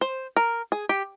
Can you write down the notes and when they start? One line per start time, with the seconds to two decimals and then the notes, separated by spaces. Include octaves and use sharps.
0.01 C5
0.36 A#4
0.72 G#4
0.89 G4